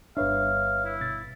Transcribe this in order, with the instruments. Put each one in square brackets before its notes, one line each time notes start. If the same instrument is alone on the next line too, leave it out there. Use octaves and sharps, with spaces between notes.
[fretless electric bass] G1 D4 [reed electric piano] B4 C#5 E5 [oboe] F5
[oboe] E4
[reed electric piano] B2 A6